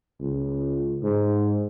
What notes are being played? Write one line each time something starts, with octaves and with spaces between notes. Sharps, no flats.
C#2
G#2